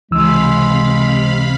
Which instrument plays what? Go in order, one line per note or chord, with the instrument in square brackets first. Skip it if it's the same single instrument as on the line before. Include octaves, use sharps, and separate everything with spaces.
[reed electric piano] C#2 E3 E6 [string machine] C3 F5 B5 [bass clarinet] G#3